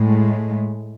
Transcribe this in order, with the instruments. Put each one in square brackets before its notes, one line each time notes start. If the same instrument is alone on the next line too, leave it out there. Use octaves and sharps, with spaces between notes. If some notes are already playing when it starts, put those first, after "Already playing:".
Already playing: [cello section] A2 G#3